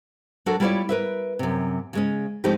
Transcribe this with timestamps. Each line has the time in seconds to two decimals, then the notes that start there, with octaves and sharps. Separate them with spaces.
0.46 F#3 D4 F#4 A4 A#4
0.60 G3 E4 F4 B4 C#5 D5
0.89 A#4 B4 E5
1.39 F#2 C3
1.93 C#3 G#3 C#4
2.44 F3 G#3 A3 C4 D#4 G4